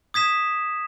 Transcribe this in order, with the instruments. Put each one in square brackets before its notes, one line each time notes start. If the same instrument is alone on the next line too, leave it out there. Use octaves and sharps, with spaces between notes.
[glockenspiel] D#6 G#6 B6 E7